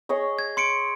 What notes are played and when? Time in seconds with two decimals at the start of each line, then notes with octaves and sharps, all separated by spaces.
0.09 G#4 C#5 D#5
0.39 G#6
0.57 C6 C#7 D7